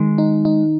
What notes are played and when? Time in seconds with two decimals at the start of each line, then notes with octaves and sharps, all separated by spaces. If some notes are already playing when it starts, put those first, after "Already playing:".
Already playing: D#3 G#3
0.18 D#4
0.45 D#4